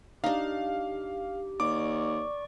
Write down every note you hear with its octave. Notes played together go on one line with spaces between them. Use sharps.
D4 D#4 G4 F5
D#2 D5 C#6 D6